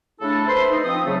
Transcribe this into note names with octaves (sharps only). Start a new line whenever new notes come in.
C#3 A3 D4 E4 A4
B4 C5 E5 B5 C6
D#4
F3 C4 D#6
C#3 F#3 A3